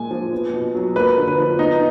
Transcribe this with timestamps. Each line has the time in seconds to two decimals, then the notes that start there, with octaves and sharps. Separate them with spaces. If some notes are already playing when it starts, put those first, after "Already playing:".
Already playing: A#2 F3 G#3 G#5
0.11 F3
0.32 B3
0.53 B2
0.75 F#3
0.96 A#3 B4
1.17 D3
1.28 B4
1.38 F3
1.59 B3 D#4